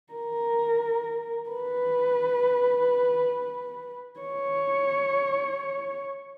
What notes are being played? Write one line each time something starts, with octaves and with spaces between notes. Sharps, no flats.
A#4
B4
C#5